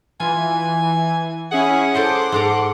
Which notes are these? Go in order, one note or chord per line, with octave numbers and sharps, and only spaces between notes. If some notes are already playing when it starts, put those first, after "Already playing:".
E3 F4 G#5
C#4 E4 G#4 F#5
A4 C5 D#5 C6 D6
G#2 A4 A#5